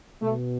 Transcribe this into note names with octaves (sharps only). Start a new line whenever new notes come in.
B2 A3